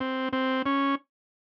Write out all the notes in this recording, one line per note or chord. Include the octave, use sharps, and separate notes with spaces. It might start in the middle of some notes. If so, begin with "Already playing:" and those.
C4
C4
C#4